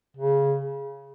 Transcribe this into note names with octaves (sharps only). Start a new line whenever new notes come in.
C#3